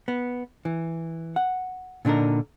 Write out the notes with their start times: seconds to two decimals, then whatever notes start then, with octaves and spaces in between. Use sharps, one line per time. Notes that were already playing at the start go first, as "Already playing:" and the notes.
0.08 B3
0.65 E3
1.36 F#5
2.05 A#2 D3 D4 D#4 A#4